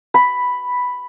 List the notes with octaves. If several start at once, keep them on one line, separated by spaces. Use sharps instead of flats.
B5